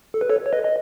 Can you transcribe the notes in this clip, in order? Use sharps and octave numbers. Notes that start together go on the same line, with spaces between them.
A4
B4
A4 C#5
C#5
B4 D#5
D#5